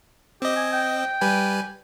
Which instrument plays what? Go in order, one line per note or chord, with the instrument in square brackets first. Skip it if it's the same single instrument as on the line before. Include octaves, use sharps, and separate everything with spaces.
[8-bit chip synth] C4 D#5 [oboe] G4
[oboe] G#5
G5
[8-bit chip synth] G3 B4 G#5